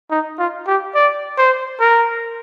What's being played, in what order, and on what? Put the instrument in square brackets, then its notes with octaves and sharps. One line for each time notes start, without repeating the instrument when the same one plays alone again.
[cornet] D#4
F4
G4
D5
C5
A#4